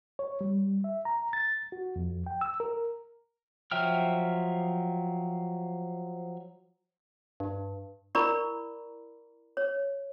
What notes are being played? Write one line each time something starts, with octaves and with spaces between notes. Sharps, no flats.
C#5
G3
E5
A#5
A6
F#4
F2
G5
E6
A#4
F3 F#3 E5 G5 F6
G2
E4 A#4 D5 A#5 B5 C#6
C#5